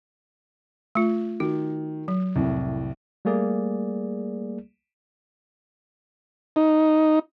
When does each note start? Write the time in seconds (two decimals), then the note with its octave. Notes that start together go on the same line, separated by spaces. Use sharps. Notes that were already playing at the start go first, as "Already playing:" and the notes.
0.95 A3 F4
1.40 D#3 F#4
2.08 F#3
2.36 C2 F2 A2
3.25 G3 A3 A#3 G#4 D5
6.56 D#4